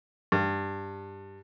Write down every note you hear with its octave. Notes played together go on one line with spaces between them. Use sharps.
G2